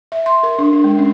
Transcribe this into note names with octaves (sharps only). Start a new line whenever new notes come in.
E5
C6
A#4
D4
D4
G#3
C#4